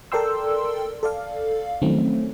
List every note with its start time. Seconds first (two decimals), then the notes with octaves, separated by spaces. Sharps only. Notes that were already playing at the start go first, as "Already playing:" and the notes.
0.12 A4 A#4 D5 G5 C6 E6
1.03 A4 D5 F5
1.82 D#3 F3 F#3 A3 C4 C#4